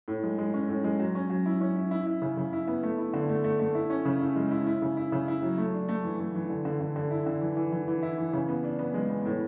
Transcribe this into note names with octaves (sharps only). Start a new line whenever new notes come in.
A2
G#3
G#3
C#4
A2
G#3
F#3
C#4
F#3
E4
C#4
E4
E4
E4
C#3
C#3
E4
B3
A3
E4
D3
A3
A3
A3
E4
C#4
C#3
E4
G#3
E4
E4
C#3
E4
C#3
E4
F#3
A3
D4
A3
E3
A3
E3
D3
D3
D3
D3
E4
D3
E3
E3
E3
E3
E4
E3
C#3
B3
D4
B3
G#3
B3
A2